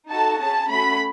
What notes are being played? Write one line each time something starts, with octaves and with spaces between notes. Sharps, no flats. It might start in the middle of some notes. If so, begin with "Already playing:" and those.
D#4 F#4 A4 A5
C#4 G#4 A5
A3 C#4 F#4 A4 B5